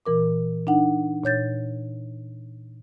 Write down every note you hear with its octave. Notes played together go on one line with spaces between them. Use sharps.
A#2 E3 A#4 D6
D4 D#4 F#5
A#2 C#5 G6 A6